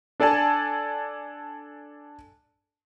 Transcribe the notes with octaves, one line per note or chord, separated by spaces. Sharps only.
D4 A4 D5 G#5 A5